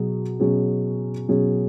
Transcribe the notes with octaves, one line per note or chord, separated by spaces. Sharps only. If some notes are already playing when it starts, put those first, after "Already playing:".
Already playing: B2 F#3 G#4
B2 F#3 C#4 G#4
B2 F#3 C#4 G#4